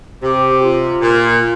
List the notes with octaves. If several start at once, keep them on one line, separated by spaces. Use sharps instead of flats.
C3 G4
F4
A#2